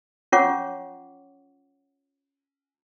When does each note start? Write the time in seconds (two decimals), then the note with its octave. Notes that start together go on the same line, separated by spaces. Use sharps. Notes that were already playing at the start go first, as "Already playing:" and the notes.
0.32 C#4 F4 C#5 F#5 C#6 D6